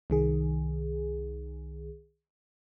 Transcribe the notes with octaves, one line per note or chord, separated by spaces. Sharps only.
C2 D#3 G#4